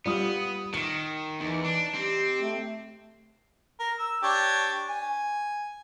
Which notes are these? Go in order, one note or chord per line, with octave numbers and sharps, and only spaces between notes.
G3 B3 F4 D#6
D#3 C#7 D7
E2 E3 D#4
D4
C4 G4
A3
A#4
E6
D4 G4 C#5
G#5